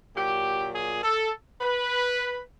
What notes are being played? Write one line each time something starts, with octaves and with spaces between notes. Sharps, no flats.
A#2 F#3 G4
G#4
A4
B4